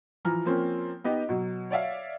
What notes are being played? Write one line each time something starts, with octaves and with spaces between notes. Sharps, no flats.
E3 F3 A#5 F6
F3 A#3 C4 C#4
B3 D#4 G4 D#5
B2 F#3
C#5 D5 E5 F5